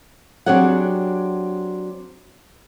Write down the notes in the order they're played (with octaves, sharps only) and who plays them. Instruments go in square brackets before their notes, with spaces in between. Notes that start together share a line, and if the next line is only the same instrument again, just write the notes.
[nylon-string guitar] F#3 C4 D4 G4 G#4 F#5